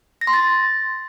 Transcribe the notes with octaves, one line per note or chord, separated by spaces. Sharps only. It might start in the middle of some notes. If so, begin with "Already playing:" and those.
A#6
C6
A6